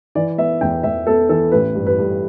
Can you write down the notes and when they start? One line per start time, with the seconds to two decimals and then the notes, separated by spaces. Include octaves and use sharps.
0.15 E3 D5
0.38 B3 E5
0.61 E2 G5
0.83 E2 E5
1.07 B3 A4
1.29 E3 A4
1.52 A1 B4
1.75 G2
1.87 B4
1.98 G2